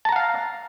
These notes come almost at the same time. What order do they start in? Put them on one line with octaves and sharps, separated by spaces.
A5 A#5 F#5 F5